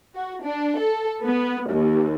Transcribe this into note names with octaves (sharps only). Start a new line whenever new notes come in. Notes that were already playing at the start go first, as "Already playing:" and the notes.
F#4
D4
A4
B3
D#2